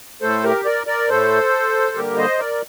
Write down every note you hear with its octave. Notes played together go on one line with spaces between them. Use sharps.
A2 A3 A4 C5
G4 A#4
A#4 D5
A#4 D5
A2 A3 A4 C5
D3 G3 A#3 G4 A#4
C5 D#5
A#4 D5